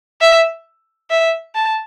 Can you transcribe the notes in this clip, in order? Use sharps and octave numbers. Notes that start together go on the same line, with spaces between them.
E5
E5
A5